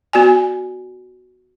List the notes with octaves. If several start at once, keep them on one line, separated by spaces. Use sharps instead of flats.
B3 F#4 D5 G#5